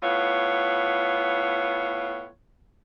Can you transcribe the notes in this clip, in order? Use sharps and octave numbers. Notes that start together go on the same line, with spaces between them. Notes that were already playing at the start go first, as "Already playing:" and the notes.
A2 B3 F4 C#5